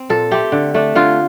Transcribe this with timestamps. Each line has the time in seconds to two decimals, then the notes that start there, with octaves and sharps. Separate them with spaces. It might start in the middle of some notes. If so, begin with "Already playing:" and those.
Already playing: C4
0.10 A#2 A4
0.31 A3 C4 G4
0.52 D3
0.74 A3 D4
0.95 D3 F4